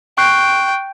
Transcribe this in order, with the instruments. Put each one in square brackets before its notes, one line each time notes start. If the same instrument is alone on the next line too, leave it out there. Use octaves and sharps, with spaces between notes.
[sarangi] G5 [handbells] C#6 F#6 C7